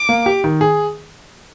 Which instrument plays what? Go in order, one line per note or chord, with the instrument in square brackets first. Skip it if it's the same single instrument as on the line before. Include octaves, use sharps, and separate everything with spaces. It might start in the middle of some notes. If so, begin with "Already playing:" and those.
Already playing: [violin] D6
[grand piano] A#3
G4
D#3
G#4